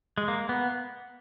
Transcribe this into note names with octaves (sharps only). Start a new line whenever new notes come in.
G#3
A#3
B3